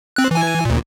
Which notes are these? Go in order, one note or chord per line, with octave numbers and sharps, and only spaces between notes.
C4 F#6
E3 G#5
D2 A#2